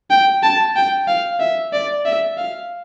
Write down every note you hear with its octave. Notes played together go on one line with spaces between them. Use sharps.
G5
A5
G5
F5
E5
D5
E5
F5